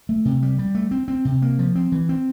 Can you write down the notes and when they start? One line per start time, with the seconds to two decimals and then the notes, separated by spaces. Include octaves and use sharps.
0.09 A3
0.25 C3
0.42 G3
0.59 G3
0.75 A3
0.91 C4
1.08 C4
1.25 C3
1.42 A#3
1.59 F3
1.75 C4
1.92 E3
2.09 C4